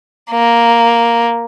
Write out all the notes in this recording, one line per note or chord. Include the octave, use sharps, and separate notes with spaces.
A#3